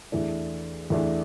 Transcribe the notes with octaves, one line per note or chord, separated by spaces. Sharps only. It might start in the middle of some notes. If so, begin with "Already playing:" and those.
E2 E3 A3 D4
E2 E3 A3 D4